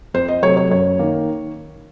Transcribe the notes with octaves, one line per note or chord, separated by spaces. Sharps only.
F2 C5
D#5
C3 F#3 A3 C#5
C#5
F#2 C#5
D#3 A#3